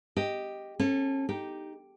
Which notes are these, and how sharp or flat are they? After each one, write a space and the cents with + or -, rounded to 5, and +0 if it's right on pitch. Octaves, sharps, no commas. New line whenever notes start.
G4 +0 D#5 +0
C#4 -35 A4 +0
D#4 +0 G4 +0